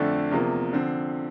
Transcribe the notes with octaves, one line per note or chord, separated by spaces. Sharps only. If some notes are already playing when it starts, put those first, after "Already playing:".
Already playing: F2 D3 A3 D4
E2 C3 F3 A#3
D3 F3 C4